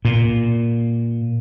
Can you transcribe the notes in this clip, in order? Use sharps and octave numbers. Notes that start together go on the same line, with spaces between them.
A#2